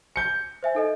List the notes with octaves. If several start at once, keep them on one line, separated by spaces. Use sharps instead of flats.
G6 C#7
C5 E5 G#5
D#4 A4 D#5